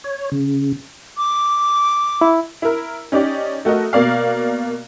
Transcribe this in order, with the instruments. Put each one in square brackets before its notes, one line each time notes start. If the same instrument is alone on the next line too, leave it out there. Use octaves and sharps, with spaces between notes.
[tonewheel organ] C#5
C#3
[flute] D6
[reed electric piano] E4
[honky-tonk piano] E4 A#4
C#4 D#4 G4 D5
A3 F#4 A#4 D#5
B2 A#3 D5 F5